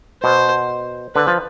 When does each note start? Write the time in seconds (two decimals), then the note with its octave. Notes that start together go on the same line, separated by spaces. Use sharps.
0.23 B2 C5
1.15 D3 B4
1.27 F3